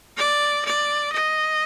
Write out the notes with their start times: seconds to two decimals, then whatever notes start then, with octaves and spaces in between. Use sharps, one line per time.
0.17 D5
0.65 D5
1.13 D#5